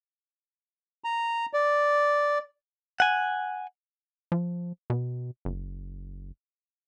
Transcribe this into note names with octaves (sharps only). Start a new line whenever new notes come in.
A#5
D5
F#5 G#5
F3
B2
F#1